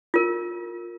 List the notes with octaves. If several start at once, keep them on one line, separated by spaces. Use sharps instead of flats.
F4 A#4